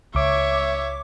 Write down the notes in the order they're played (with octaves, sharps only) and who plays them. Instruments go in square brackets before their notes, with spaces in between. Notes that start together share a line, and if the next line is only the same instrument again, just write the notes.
[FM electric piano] C#2 D6 [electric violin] C#5 E5